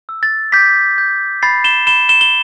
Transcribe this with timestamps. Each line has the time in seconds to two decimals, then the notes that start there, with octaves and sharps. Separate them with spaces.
0.09 E6
0.23 A6
0.52 D6 G6 B6
0.98 G6
1.42 B5 A6 C7
1.64 E7 G7
1.87 B5 E7 G7
2.09 E7 G7
2.21 G7